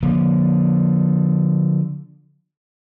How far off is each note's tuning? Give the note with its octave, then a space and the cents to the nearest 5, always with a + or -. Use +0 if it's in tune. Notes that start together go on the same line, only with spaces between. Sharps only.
D3 +0 F3 +25 A#3 +35